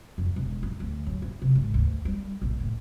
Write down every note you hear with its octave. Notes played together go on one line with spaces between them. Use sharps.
F2
E1
D#4
D2
F#3
E4
C3
G#1
D2
G3
A#1
A2